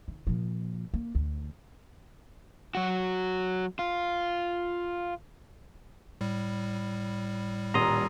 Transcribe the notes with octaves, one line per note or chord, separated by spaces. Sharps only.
D#3
A#2 F3
A#3
D2
F#3 F#4
F4
A2 G3
D#1 A#5 C6 D#6